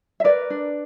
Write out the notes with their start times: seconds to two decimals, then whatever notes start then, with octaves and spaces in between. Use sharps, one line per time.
0.20 E5
0.24 A#4 B4 D5
0.50 D4